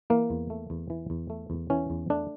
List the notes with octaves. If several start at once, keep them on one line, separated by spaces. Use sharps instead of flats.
E3 A#3
E2
A3
E2
E3
E2
A3
E2
E3 C#4
E2
A3 D4